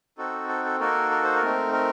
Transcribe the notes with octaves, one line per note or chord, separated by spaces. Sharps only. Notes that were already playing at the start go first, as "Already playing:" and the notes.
C4 D#4 F#4 A4
A4
A4
A#3 D#4 F#4 A4 A#4
A#4
C5
A#4
A3 C4 D#4
A#4